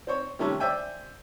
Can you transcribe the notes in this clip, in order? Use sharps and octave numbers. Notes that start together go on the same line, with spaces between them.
C4 C5 C#5
C3 D#3 G3 A3 C#4
C5 D5 E5 G5 G#5